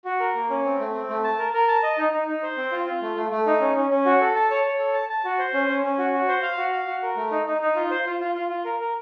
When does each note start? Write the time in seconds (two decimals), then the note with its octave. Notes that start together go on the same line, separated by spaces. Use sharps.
0.05 F#4
0.20 A#4
0.35 A#3
0.50 C#4
0.65 C4
0.79 A3
0.95 C4
1.09 A3
1.24 A5
1.38 A#4
1.53 A#4
1.68 A5
1.83 D#5
1.98 D#4
2.12 D#4
2.28 D#4
2.43 C5
2.57 C4
2.72 F4
2.86 F4
3.02 A3
3.16 A3
3.31 A3
3.46 D#4
3.61 C#4
3.76 C#4
3.90 C#4
4.05 F#4
4.21 A4
4.36 A5
4.50 C#5
4.65 C#5
4.79 A4
4.94 A5
5.09 A5
5.24 F#4
5.39 C5
5.53 C#4
5.68 C#4
5.83 C#4
5.98 F#4
6.13 F#4
6.28 C5
6.43 F5
6.58 F#4
6.72 F5
6.87 F#4
7.03 A#4
7.16 A3
7.31 D#4
7.47 D#4
7.61 D#4
7.76 F4
7.91 C5
8.06 F4
8.20 F4
8.36 F4
8.50 F4
8.65 A#4
8.80 A#4